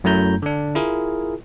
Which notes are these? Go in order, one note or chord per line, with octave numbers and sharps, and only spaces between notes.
F#2 F#3 A3 E4 A#5 G6
D3 D4
E4 F4 G#4 A#4